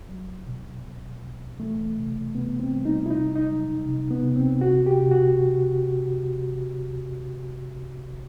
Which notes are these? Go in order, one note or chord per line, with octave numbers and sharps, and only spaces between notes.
F#3
B2
B2
B2
E3 A3
C3
C3 B3
C4
G3
D#4
E4
C3 D#4
D#4
F#3
C3
B3
C3
C4
C3 F#4
G4
C3
F#4